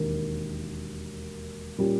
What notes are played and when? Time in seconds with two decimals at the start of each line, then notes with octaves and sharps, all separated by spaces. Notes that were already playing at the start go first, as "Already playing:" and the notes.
Already playing: E1 D#2 D#3 A#3
1.78 A#2 G3 C#4 G4